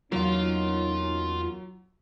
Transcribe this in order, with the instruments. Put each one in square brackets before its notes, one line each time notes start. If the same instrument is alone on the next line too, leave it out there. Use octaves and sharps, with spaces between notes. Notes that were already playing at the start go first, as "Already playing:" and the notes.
[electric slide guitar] E2 A#3 [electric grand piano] F#3 [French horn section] C#4 D#4 [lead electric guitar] F4 F5